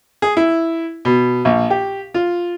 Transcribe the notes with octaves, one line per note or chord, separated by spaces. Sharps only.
G#4
E4
B2
A#1
G4
F4